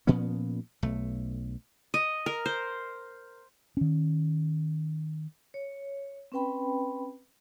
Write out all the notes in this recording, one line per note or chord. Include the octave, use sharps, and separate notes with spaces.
A#2 F3 B3 C#4
B1 A3
D#5
A#4
C5
D#3 C#4
C#5
C4 C#4 B4 G5 B5